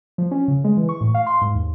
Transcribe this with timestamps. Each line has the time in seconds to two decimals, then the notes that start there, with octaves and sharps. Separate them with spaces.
0.18 F3
0.31 C#4
0.48 C#3
0.64 G#3
0.77 E3
0.89 C#6
1.01 A2
1.14 F5
1.26 C6
1.41 G#2
1.54 D#2